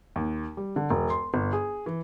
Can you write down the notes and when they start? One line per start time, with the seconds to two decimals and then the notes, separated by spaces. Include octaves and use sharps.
0.16 D#2
0.57 G3
0.76 D3
0.90 E1
1.10 C6
1.34 G1
1.53 G#4
1.86 E3